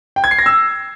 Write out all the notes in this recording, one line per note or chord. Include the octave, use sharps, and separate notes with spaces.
G5
G#6
C7
A#6
E6